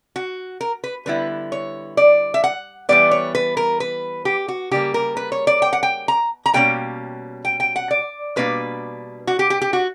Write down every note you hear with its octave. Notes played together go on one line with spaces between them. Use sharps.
F#4
A#4
B4
D3 G3 B3 E4 B4
C#5
D5
E5
F#5
E3 G3 B3 D5
C#5
B4
A#4
B4
G4
F#4
C#3 G3 A#3 G4
A#4
B4
C#5
D5
G5
F#5
G5
A#5
A#5
B2 G3 A#3 C#4 G5
G5
G5
F#5
D5
B2 G3 A#3 D4 B4
F#4
G4
G4
G4
F#4